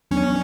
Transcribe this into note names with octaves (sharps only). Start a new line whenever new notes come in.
F#3 B3 C#4 D4